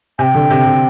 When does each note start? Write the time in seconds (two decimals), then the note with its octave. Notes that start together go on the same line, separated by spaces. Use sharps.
0.19 C3 G#5
0.22 G5
0.35 D3
0.50 C3
0.66 C3